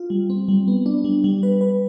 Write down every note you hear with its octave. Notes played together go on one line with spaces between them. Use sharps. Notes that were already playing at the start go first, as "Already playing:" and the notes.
Already playing: F4
G3
C4
G3
B3
D4
G3
G3
B4
B4